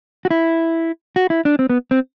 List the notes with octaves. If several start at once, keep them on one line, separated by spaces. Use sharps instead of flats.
F#4
E4
F#4
E4
D4
C4
B3
C4